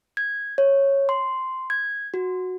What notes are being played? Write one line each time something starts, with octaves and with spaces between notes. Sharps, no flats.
G#6
C#5
C6
G#6
F#4